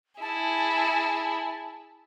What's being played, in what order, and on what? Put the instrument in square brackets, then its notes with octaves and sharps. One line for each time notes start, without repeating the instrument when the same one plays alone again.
[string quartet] E4 G#4 [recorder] A5